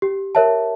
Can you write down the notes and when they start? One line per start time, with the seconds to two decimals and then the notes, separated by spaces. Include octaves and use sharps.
0.02 G4
0.35 A#4 C#5 E5 A5